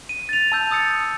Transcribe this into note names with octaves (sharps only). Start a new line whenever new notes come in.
D#7
A6 F7
A5 E6 G6
D#6 E6 A6 C#7